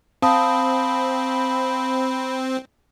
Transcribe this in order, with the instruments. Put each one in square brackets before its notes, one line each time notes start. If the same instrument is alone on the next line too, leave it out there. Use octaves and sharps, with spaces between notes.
[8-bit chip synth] C4 [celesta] F5 A5 D#6 [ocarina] B5